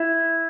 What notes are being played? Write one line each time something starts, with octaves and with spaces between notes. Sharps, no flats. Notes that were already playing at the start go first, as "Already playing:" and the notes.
Already playing: E4